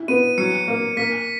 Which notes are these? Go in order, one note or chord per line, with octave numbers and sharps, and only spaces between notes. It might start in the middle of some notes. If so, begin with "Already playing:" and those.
Already playing: E4
B3 D#7
F#3 C#7
A#3
A#3 B6